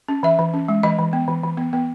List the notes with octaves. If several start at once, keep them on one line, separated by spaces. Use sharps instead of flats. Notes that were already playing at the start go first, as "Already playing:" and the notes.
C#4
E3 E5
E3
C#4
G#3
E3 D#5
E3
B3
E3
E3
B3
B3